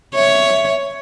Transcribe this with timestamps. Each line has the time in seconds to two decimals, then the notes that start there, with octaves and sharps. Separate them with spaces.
0.15 C#5 E5